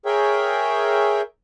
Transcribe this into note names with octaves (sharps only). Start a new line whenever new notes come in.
G#4 A#4 C#5 E5 G5